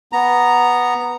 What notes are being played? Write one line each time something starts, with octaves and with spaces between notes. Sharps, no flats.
B3 A#5